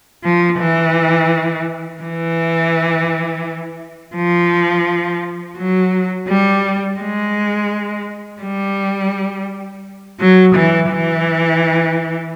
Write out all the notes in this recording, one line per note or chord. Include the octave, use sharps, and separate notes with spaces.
F3
E3
E3
F3
F#3
G3
G#3
G3
F#3
E3
E3